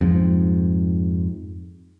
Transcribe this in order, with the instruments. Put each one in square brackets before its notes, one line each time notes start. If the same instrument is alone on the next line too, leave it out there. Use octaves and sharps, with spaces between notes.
[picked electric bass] F2 G#2